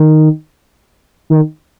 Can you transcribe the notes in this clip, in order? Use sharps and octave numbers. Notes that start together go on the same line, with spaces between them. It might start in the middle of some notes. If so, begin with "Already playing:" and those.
Already playing: D#3
D#3